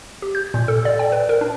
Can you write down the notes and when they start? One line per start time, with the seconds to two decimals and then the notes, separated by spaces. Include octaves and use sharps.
0.22 G4
0.35 G6
0.54 A#2
0.68 A4
0.85 D5
0.99 G5
1.12 B4
1.29 A#4
1.41 D4